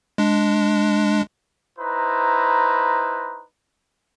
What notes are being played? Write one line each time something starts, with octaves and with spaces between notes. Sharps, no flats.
G#3 D4
D#4 E4 B4 C5 A#5